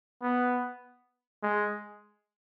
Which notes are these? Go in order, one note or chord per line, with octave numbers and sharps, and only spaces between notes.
B3
G#3